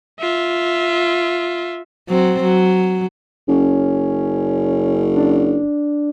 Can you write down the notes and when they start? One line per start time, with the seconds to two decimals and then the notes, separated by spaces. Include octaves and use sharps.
0.20 F4 E5
2.09 F#3 C4
2.43 F#3
3.48 F#1 C#4
5.15 D4